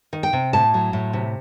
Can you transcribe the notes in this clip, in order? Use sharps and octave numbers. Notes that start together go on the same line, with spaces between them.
D#3
G5
C3
A2 A5
F#3
A2
C3